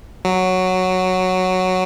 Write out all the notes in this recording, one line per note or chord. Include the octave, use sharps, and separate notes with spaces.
F#3